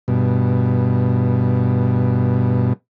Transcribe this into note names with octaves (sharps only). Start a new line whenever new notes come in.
G2 B2